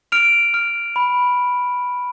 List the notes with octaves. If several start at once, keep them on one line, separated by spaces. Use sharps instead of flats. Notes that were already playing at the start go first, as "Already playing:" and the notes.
F6 D7 F7
F6
B5